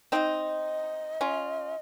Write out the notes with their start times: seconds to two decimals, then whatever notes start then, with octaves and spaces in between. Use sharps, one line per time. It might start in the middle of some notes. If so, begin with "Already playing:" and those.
0.12 C4 D#4 D#5 G5
1.21 C#4 F4